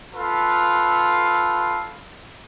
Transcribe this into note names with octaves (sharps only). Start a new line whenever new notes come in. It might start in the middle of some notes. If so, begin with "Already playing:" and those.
F4 A4 B4